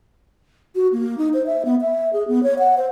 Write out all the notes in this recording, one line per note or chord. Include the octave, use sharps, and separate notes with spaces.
F#4
A#3
D#4
C5
E5
B3
E5
G#4
B3
C#5
F#5
C5